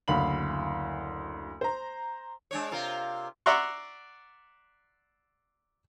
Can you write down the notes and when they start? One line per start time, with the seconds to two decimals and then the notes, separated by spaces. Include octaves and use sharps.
0.08 F#1 D2 F5 B5 F#7
1.61 C5 A#5
2.51 G#3 D4 C#5
2.71 C3 F4 A#4
3.46 D5 E5 F#5 A#5 C6 C#6